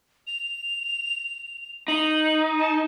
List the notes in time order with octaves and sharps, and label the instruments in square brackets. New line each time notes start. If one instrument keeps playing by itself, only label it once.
[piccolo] F7
[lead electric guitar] D#4 [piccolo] F#7
[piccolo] A5